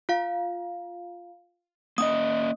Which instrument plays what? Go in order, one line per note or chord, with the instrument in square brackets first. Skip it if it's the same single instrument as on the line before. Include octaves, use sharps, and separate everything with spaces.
[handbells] F4 F5
[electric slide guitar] A#3 C#4 D#5 [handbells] D#6